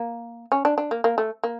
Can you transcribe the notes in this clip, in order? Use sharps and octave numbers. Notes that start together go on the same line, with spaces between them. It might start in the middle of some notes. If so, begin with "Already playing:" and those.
Already playing: A#3
C#4
D4
D4
A#3
A#3
A3
A#3